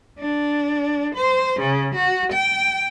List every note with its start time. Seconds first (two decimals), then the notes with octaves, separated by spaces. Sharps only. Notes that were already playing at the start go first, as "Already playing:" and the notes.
0.19 D4
1.15 C5
1.60 C#3
1.95 F#4
2.33 G5